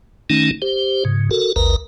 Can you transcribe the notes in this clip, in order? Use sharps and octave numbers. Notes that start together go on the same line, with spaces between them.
D#3 A3 C#4 D#4
G4 C5
G#2 C#3
F#4 A4 A#4
A1 D#2 A#4 B4 A#5